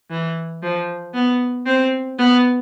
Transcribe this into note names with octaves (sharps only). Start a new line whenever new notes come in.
E3
F3
B3
C4
B3